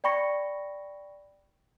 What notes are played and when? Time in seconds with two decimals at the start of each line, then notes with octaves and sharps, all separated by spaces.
0.04 D5 G5 B5 C#6 A#6 C#7